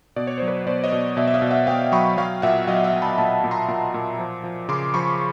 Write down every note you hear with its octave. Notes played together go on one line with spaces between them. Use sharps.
B2 D5
C#5
F#3 C5
B4 C#5
B2 C5 D5
C#5 D#5
B2
B2 D5 E5
E5
D#5 F5
B2
E5 F#5
B2 F5 G5
F#3 B5 C#6
F#3 F5 G5
A#2 E5 F#5
F#3 D#5 F5
E5 F#5
F#3
A5 B5
A#2 A5 B5
A#2
A#5 C6
A#2
A#2
F3
F3
C#3 C6 D6
F3 B5 C#6